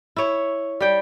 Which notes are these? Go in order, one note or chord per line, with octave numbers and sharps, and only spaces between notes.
E4 C#5
G3 G5